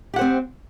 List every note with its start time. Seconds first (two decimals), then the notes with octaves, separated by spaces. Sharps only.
0.14 G4
0.16 F#5
0.19 C5
0.21 C4